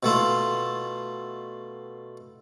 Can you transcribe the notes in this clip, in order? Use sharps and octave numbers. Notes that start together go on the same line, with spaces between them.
B2 A3 E4 F4